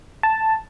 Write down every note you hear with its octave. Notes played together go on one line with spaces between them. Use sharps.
A5